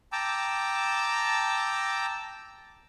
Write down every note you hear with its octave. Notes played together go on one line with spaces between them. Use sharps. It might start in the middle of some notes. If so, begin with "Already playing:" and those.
G5 A5 A#5 D6 E6